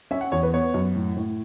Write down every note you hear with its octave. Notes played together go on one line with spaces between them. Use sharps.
C#4 E5
F#5
E2 C#5
B4
B3 C#5
F#2
A2
A2